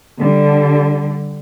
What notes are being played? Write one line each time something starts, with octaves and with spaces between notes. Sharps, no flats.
D3 G3